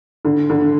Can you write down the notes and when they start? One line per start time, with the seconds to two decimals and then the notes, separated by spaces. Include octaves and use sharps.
0.25 D3
0.50 D3